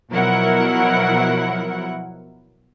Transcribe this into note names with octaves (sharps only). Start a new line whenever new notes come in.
B2 F3 F#3 E4 A#4 F#5